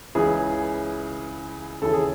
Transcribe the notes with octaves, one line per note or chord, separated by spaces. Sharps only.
C#2 C#3 E3 G#4
D#2 C#3 E3 A4
G#4